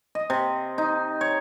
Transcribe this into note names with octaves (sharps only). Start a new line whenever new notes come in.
D#5
C3
D#4
C#5